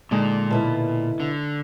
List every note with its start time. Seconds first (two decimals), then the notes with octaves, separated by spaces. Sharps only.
0.11 A#2 D3 G#3 D#4
0.51 B2 E4 B4 A5
1.20 D3